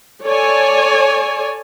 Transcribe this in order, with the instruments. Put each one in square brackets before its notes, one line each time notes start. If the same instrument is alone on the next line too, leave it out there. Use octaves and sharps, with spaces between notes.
[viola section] A4 C#5 D5 G#5